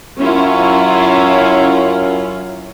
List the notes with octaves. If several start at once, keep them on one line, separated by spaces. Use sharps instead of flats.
F#2 C#4 E4 F4